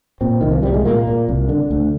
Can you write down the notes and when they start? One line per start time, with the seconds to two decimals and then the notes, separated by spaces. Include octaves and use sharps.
0.21 A#2 C4
0.41 C2 D#3
0.52 F3
0.63 C2 G3
0.74 G#3
0.85 A#2 A#3
1.07 A#2
1.28 C2
1.49 D3
1.71 D2